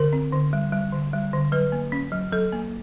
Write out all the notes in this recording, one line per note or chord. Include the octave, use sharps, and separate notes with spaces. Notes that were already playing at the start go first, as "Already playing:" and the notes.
Already playing: D3 A#4
C4
D3
G3
G3
D3
G3
D3
F#3 B4
A#3
C#4
F#3
F#3 A4
A#3